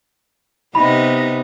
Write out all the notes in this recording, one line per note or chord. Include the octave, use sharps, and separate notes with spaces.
C3 B3 D#4 B5